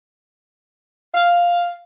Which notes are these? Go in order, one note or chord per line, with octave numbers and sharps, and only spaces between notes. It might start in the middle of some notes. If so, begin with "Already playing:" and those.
F5